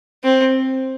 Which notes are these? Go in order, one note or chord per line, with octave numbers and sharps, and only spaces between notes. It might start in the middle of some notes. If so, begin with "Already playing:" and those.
C4